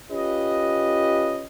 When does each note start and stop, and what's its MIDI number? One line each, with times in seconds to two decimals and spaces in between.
0.11 1.47 61
0.11 1.47 65
0.11 1.47 67
0.11 1.47 71
0.11 1.47 75